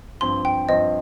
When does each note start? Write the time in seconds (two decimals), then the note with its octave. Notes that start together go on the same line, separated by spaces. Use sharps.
0.21 G2 F3 C4 C6
0.45 G5
0.69 G2 F3 C4 D#5